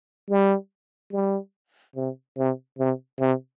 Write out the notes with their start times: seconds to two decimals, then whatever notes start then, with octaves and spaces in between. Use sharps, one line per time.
0.30 G3
1.12 G3
1.96 C3
2.38 C3
2.79 C3
3.20 C3